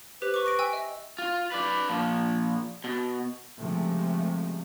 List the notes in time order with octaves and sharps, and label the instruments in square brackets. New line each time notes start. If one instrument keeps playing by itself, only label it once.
[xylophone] G4 C5 [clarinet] B4
[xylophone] C#6 D6
C#6 A#6 D7
G5 G#5 E6
D#5 E5
[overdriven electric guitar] F4
B4 D5
A#2 F3
B2
[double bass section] C#2 C3 F3 G#3 A3